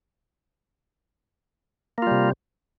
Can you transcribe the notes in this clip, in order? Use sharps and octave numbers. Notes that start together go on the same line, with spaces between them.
C3 G3 A#3 F4